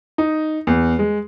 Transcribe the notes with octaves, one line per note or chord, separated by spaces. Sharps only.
D#4
E2
G#3